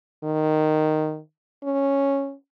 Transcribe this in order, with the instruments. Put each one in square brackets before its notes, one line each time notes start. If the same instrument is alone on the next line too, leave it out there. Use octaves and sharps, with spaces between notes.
[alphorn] D#3
C#4